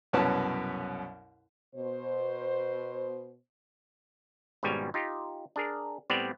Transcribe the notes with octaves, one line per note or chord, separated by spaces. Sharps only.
C2 F#2 B2 C#4 B4 A5
B2 C5
G#1 G#2 B2 G3 C#4 G#5
D#4 F4 G4
D4 G#4 A#4
A2 G3 B3 C4 D5